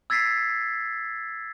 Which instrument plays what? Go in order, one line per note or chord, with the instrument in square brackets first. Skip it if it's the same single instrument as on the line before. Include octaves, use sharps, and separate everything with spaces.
[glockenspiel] E6 G#6 A6 B6 C7